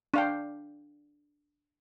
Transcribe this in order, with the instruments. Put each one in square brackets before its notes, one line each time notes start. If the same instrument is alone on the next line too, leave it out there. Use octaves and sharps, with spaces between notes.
[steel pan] D4 F5 G5